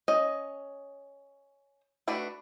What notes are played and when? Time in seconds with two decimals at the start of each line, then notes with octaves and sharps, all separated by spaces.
0.08 C#4 D#5
2.08 A3 D4 F#4 B4